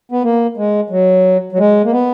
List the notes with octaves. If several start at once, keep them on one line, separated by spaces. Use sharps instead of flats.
B3
A#3
G#3
F#3
F#3
G#3
A#3
B3